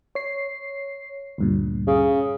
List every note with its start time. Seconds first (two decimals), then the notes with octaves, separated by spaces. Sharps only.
0.15 C#5 C7
1.38 D2 G2 A#2
1.87 C#3